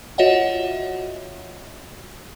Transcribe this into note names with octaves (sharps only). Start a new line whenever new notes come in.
F4 F#4 C#5 D#5 E5 F#5